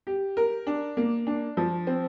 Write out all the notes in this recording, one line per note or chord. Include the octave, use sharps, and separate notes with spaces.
G4
A#4
D4
A#3
D4
F3
C4